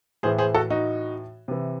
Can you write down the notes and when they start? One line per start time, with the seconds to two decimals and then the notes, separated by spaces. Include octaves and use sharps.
0.23 A2 E3 G#4 C5
0.38 G#4 C5
0.55 F#4 A4
0.70 D#4 F#4
1.48 C3 E3